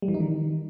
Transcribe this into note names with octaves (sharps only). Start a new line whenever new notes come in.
G3
E3
D#4
D#3